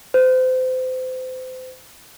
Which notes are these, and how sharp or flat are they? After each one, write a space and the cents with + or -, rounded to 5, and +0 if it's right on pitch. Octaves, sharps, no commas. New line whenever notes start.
C5 -30